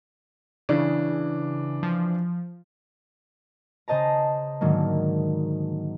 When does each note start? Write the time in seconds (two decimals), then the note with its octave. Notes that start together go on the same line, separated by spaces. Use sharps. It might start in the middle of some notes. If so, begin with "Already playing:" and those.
0.69 C#3 E3 D4
1.83 F3
3.88 C#3 C5 D#5 A5 A#5
4.61 G#2 D3 D#3 F#3 A#3